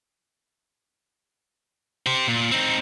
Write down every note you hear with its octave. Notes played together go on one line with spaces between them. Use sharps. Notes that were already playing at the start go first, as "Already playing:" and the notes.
G4 C5
A#2
C4 D#4